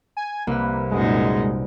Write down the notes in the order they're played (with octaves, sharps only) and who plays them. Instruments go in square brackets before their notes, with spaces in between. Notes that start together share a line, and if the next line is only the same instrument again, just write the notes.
[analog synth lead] G#5
[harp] C2 B4 [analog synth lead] A#3
[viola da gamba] F#2 A#2 D#4 [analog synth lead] G#3